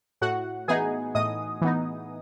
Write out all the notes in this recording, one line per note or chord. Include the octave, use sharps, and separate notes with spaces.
A2 F#4 F#5
E3 B3 D#4 G#4 G#5
A2 D#5 D#6
E3 B3 D#4